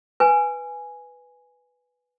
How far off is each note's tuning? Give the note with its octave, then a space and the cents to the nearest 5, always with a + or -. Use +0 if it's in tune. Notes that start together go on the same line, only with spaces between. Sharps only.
B4 +0 G#5 +0